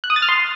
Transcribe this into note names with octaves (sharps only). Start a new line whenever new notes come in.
F#6
D#6
A6
F6
C6